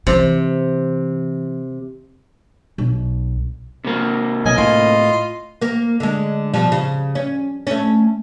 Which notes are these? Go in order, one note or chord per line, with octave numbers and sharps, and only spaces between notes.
C3 E3
B1
C3 A#3
B1 D#5 G#5
A2 F4
A#3 A#4
D3 G#3
B2 F3 G3
C#3
C#4
A3 C#4